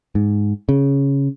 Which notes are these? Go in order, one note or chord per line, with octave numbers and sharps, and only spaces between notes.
G#2
C#3